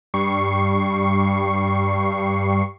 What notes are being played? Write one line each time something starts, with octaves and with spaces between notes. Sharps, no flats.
G2 G3 C#6 C7